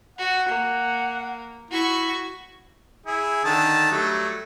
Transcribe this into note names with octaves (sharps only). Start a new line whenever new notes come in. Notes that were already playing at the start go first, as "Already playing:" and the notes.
F#4 F#5
A#3
E4 F#4 C#6
E4 G#4
D3 D#3 A5
F#3 G3 A3